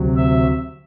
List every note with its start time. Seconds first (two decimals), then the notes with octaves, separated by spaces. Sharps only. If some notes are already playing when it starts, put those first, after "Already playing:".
Already playing: D2 C3 F#3
0.16 E5